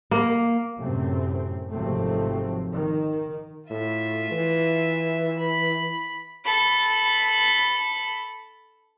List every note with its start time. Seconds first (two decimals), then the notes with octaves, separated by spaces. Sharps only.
0.11 A#3
0.78 F#2 A2 C3 A3 C4
1.72 G#1 C3 F3 F#3 A3 C4
2.72 D#3
3.70 A2 F4 E5
4.31 E3
5.39 B5
6.45 A4 B5